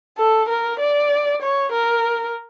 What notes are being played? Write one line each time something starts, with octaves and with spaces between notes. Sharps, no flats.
A4
A#4
D5
C#5
A#4